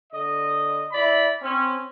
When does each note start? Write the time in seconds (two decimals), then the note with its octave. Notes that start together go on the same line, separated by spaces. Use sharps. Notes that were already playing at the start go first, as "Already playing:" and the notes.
0.12 D3 D#5
0.93 E4 D5 B5
1.42 C4 C#4